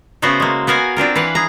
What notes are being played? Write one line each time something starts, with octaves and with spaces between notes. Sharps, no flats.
C#3 A3 B3 F#4 C5
G#3 A#3
B3 F#4 A#4 F5 G#5
C4 D4 F4 A#4
E3 B4 F5 F#5
G#4 A#5